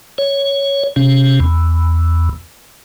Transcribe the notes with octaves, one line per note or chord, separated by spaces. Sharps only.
C#5
C3 C#4
E2